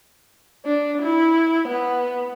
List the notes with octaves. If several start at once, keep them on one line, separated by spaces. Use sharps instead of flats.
D4
E4
B3